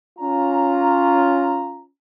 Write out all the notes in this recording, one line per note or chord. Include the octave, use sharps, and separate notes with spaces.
C#4 F4 A#5